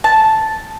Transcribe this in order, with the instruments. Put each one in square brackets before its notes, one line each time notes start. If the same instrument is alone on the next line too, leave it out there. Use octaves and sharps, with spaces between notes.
[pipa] A5